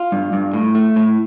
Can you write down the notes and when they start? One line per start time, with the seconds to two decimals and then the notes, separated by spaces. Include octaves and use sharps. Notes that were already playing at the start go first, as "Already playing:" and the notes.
Already playing: F4
0.12 G2
0.33 G2
0.53 A2
0.75 A3
0.96 A2